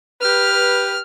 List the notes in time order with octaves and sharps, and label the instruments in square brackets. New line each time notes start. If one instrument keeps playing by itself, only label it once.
[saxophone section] G4 B4 [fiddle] F6